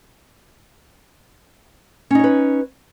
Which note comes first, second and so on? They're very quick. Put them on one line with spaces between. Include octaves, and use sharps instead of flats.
C#4 D#4 C#5 B4